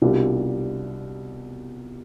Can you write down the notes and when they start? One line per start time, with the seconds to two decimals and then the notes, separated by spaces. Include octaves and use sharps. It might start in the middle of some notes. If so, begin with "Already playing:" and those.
0.02 C2 B2 G3 D4 F4